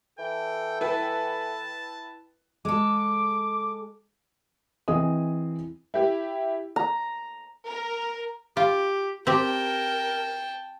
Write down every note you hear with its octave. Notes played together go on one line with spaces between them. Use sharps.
E3 A4 G5
E4 B4 G5 A5
G#3 A4 D6
E3 C4 G#4 D#5 D#6
E4 G4
A#5
A#4
F4 G4
C4 G4 A#4 G5 A5